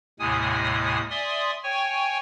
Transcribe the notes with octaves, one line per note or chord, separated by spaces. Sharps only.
D#2 A2 C3 G#3 G#5 D#6
D5 E5 G#5 C6 D#6
C#5 G5 G#5 C#6